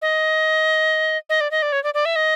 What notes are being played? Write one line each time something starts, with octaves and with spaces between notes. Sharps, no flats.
D#5
D#5
D5
D#5
D5
C#5
D5
D5
E5
D#5